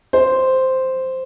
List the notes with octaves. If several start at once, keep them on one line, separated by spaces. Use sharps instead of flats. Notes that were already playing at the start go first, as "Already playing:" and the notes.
C5